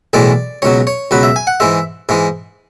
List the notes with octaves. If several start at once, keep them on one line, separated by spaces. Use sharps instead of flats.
B1 A2 E3 G#3 D5
C#2 B2 F#3 C#5
C#5
C#2 B2 F#3 B4
E5
G#5
F#5
G#2 E3 G#3 E5
G#2 E3 G#3